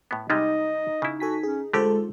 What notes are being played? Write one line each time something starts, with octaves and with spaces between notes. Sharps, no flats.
A2 B3
C3 G3 G#3 D#4 D#5
C#3 E4
F#4 A4 G#5 B6
C#4 G#4
D3 G#3 A3 F4 G4 A4 C5